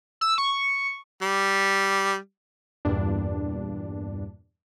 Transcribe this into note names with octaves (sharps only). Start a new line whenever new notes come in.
E6
C#6
G3
E2 G2 A#2 D4